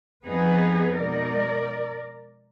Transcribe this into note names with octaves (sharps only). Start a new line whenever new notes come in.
F2 F3 B3 D#4 G#4 B4
B2 G#3 D#4 A#4 D5